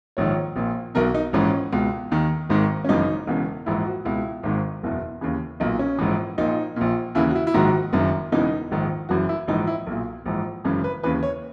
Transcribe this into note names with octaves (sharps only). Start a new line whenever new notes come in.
A#1 G#2 D#3 C#5
A#1 A#2
B1 B2 A#4
D#4
A#1 G#2 E3 C#4
C#2 B2
D#2 D#3
G#1 G#2 D#3
C#4
G#1 F#2 C#3 E3 D#4
E1 E2 C#3
A#1 G#2 E3 E4
F#4
C#2 B2 E4
G#1 G#2 D#3
F#1 E2 B2
D#2 C#3 E3
B1 A#2 D#4
C#4
A#1 G#2 E3
A#1 A#2 D#4
A#1 A#2
D#2 C#3 E3 E4
F#4
E4
E4
A#1 G#2 D#3 F#4
F#1 F#2 D#3
E1 E2 C#3 E3 D#4
A#1 G#2 D#3
F#1 F#2 E3 F#4
E4
A#1 G#2 E3 D#4
E4
B1 A#2
A#1 G#2 E3
G#1 F#2 C#3 E3
B4
D#2 C#3 E3 B4
C#5